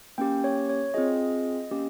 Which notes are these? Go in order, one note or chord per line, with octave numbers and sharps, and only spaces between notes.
A#3 C#4 G4 G5
C#5
C#5
C4 F4 G#4 D#5
A#3 C#4 G4